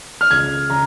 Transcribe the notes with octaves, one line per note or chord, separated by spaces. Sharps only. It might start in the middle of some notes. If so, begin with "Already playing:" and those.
F6
C#2 G#6
C#3 A#5